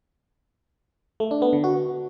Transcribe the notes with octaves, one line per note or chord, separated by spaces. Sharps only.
A3
D4
B3
D3
F#4